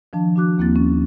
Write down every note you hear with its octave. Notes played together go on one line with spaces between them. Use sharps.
D#3 F3 D4 A5
D4 F#4 D6 F#6
D#2 A#3 C4 E4 A6
C#4